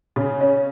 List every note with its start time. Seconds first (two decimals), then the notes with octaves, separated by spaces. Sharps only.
0.16 C#3
0.41 C#4